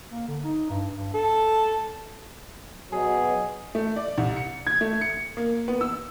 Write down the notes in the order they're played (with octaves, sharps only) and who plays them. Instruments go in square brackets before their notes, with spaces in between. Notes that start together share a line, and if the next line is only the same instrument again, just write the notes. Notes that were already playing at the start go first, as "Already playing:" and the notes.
[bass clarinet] A#3
D3
D#4
G2
G2
A4
[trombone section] B2 F#3 [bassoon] G#4
[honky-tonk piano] A3
D5
C2
C#7
G#6
A3
C#7
A#3
B3
E6